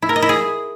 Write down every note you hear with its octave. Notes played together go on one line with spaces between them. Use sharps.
E4
A#4
D#5
E4
G#4